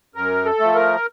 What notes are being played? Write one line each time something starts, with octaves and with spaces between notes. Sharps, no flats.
F#2 A#4
A4
F3 A3
A#4